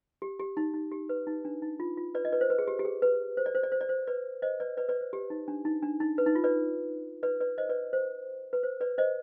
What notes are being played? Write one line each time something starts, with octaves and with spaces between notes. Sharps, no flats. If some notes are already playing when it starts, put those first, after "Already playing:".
G4
G4
D#4
D#4
G4
B4
D#4
D4
D#4
F4
F4
B4 D5
D#5
B4 D5
C5
B4
G#4
G4
G4
G#4
B4
C5
D5
C5
D5
C5
D5
C5
B4 D5
C5 D#5
B4 D5
B4 D5
B4 D5
C5
G4
D#4
D4
D#4
D4
D#4
B4
D#4
F4
B4 D5
B4 D5
B4 D5
C5 D#5
B4 D5
C5
B4
C5
B4 D5
C5 D#5